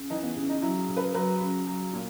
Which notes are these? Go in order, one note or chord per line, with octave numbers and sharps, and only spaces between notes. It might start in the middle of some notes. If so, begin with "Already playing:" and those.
Already playing: C#3
E3 D#4
B3
C#3
D#4
F#3 E4
C#3
B4
F#3 B4
C#3
F#3
A#2